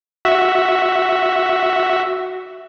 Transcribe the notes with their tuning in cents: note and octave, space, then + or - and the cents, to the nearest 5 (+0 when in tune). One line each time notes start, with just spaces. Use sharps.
F#4 +0 E5 +0